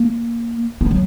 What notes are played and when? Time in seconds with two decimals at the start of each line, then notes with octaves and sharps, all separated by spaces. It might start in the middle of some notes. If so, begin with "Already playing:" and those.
Already playing: A#3
0.81 B3
0.91 F#3